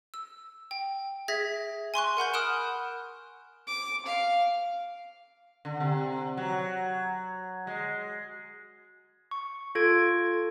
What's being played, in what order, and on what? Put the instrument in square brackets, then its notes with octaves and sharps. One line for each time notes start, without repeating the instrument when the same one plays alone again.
[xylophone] E6
G5
G#4 E5 G#6 A#6 B6
G#5 C6 C#6 F#6
A#4 F#5 B5 G6
B5 D#6 F6 F#6 D7 E7
[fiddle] D6
F5
[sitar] D3
C3
F#3
G#3
[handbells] C#6
F4 A4 G#6 D7